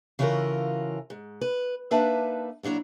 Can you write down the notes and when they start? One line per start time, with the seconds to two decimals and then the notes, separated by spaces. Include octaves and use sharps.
0.19 C#3 E3 F4 F#4 A4 A#4
1.10 G#2
1.41 B4
1.91 A#3 D4 D#4 B4 E5 A5
2.63 A#2 F#3 D4 E4 A#5